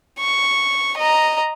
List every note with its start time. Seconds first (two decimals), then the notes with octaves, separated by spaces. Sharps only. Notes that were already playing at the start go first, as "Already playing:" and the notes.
0.20 C#6
0.98 D#5 A#5